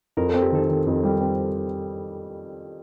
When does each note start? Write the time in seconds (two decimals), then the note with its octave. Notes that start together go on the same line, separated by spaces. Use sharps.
0.17 F2 A#4
0.30 C4 A4
0.42 G4
0.52 D#3 A4
0.69 D#3
0.87 F2
1.03 G3
1.21 C4